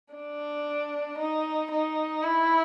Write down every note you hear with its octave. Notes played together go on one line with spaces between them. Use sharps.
D4
D#4
D#4
E4